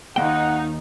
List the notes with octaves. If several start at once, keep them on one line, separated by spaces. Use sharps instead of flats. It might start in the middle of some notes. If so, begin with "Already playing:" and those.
D#2 D#3 A#3 D#4 F#5 G5